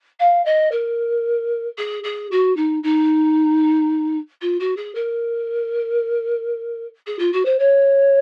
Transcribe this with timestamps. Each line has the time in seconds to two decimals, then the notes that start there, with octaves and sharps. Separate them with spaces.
0.19 F5
0.45 D#5
0.71 A#4
1.77 G#4
2.03 G#4
2.31 F#4
2.56 D#4
2.83 D#4
4.41 F4
4.59 F#4
4.76 G#4
4.94 A#4
7.06 G#4
7.18 F4
7.32 F#4
7.45 C5
7.59 C#5